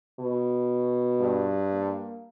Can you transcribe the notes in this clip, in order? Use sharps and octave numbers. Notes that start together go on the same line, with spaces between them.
B2
G2
A#3